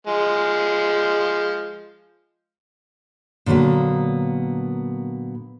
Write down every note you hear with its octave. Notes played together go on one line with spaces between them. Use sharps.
F3 G#3
A#2 D3 F#3 A#3 B3